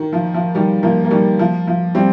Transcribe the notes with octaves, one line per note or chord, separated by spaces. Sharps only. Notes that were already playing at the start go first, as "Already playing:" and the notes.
Already playing: D#3
F3
F3
D#3 G3
F3 A#3
A#3
D#3 G3
F3
F3
G3 C4